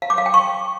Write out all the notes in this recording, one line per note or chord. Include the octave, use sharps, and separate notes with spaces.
F5
D6
F5
G5
C#6